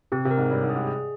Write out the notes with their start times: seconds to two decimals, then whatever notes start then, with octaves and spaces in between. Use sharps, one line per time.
0.12 C3 C4
0.25 C3
0.31 A#4
0.37 G#2
0.51 G2 C#5
0.63 G#2
0.70 G#4
0.75 G#2
0.87 G#4